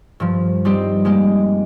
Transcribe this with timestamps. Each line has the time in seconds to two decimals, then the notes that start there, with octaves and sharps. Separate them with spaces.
0.20 G2 F3
0.65 G3 C4 D#4 G4
1.05 G#3 A#3 G4